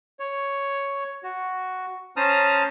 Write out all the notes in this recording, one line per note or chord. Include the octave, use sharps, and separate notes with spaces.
C#5
F#4
C#4 C5 A5 A#5 D#6 F6